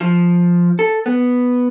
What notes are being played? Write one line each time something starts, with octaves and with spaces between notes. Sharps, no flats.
F3
A4
B3